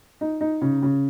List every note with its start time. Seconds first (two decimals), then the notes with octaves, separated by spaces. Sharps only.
0.21 D#4
0.41 D#4
0.61 C#3
0.82 C#3